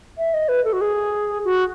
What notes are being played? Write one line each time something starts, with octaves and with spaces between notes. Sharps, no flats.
E5
D#5
B4
A4
F#4
G#4
F#4